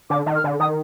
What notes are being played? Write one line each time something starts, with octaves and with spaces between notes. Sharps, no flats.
D3 D6
D#3
F6
D3
D#3 D#6